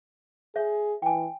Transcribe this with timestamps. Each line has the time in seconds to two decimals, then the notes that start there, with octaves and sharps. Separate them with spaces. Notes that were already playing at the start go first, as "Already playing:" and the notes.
0.56 G#4 C#5 E5
1.02 E3 G5 G#5